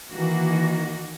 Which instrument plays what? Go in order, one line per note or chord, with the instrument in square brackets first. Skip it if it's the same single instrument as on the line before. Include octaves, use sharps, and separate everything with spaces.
[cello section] D#3 A#3 F#4 [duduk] E3